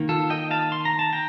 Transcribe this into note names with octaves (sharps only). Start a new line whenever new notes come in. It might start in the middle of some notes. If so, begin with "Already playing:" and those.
Already playing: D#3 A#3
F4 A4
D#5 G5
F5 A5
C6
A#5
A5
G5 A#5